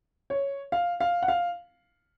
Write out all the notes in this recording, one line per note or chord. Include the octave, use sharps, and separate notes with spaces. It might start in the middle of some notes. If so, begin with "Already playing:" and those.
C#5
F5
F5
F#5
F5